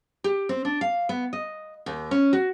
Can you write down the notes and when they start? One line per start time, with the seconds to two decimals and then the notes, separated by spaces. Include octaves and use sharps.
0.24 G4
0.49 C4
0.65 D4
0.81 F5
1.09 B3
1.33 D#5
1.86 D#2
2.11 C#4
2.33 F#4